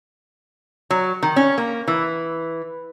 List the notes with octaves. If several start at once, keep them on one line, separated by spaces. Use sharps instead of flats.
F#3
D#3
C#4
A#3
E3